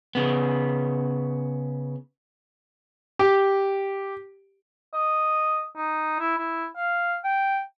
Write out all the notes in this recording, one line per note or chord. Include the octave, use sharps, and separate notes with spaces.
C#3 B3
G4
D#5
D#4
E4
E4
F5
G5